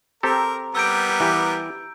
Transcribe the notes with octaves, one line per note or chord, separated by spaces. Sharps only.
C4 G4 A4 A#4 A#5
G3 B3 A#4 E6 G6 D7
E3 G4